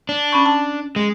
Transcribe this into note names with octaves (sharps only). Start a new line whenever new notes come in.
D4
C#4 B5 C#6
A5
G#3